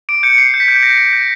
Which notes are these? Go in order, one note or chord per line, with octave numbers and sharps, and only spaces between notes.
D6 D7
G6 C#7
G6 C7
G6
B6
G6
G6 A#6
G6
G6